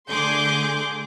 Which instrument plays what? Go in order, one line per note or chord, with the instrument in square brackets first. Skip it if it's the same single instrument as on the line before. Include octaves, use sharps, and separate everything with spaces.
[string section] D3 A3 G#4 C6 D6 G6